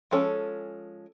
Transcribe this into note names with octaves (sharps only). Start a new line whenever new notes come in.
F3 G#3 C#4 A4